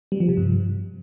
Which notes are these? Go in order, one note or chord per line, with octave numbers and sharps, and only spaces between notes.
G3
F3
C3
G2